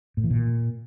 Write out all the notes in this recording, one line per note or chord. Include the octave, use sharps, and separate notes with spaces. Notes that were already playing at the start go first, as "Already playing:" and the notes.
A2
E3
A#2